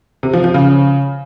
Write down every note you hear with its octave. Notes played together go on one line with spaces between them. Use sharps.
C3
F3
F3
C#3